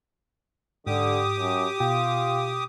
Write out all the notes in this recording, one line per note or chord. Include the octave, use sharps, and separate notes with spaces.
G#2 D3 G4 D6 D#6
F#2
B2 F4 G5